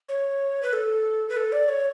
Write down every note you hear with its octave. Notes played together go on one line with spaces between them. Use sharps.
C#5
B4
A4
B4
A4
D5
C#5